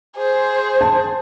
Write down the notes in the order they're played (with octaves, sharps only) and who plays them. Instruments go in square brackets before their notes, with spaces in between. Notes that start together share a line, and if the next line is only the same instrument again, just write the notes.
[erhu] G#4 [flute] C5
[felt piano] A5